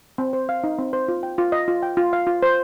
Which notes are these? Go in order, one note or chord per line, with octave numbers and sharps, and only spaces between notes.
C4
C5
F5
D#4
C4
C5
F4
G5
F4
D#5
F4
G5
F4
F5
F4
C5